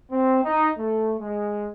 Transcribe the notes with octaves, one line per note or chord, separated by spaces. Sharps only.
C4
D#4
A3
G#3